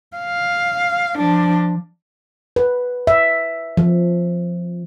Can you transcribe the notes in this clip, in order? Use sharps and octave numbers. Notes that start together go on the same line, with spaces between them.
F5
F3 D4
B4
E5
F3